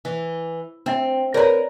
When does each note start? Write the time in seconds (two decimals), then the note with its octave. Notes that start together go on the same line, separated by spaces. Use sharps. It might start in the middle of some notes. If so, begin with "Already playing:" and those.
0.05 E3
0.86 C4 D4 E5
1.34 A#4 B4 C#5 D5 A#5